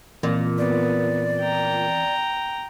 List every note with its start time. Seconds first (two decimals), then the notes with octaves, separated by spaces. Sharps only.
0.23 A#2 E3 C4
0.58 B3 D5
1.40 G5 A#5